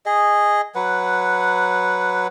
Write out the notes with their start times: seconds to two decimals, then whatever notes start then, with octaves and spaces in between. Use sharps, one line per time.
0.06 G#4 D#5
0.75 F#3 B4 F#5